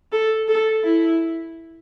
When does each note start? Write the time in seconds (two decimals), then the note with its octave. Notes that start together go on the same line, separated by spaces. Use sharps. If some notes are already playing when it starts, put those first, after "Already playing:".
0.12 A4
0.48 A4
0.84 E4